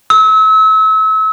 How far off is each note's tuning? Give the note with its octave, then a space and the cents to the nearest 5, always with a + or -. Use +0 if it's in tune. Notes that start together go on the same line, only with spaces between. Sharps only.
E6 -35